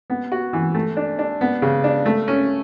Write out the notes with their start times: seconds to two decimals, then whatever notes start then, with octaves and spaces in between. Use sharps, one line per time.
0.10 B3
0.32 F#4
0.53 E3
0.75 A3
0.97 D4
1.19 D4
1.41 B3
1.62 C#3
1.84 D4
2.06 A3
2.28 C#4